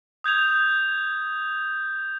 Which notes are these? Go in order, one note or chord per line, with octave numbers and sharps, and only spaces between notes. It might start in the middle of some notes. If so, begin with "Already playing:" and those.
D#6 G6 G#6 F7